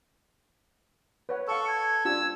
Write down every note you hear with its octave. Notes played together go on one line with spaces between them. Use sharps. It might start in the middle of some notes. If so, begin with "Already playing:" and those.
B4 C#5 F#5
A4 F5 C#6 E6
G#6
D4 F4 G4 E6